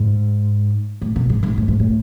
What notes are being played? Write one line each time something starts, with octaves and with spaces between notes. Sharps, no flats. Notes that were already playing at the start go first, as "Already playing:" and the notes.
Already playing: G#2
A2
B2
G#2
G#2
A2
G#2
A2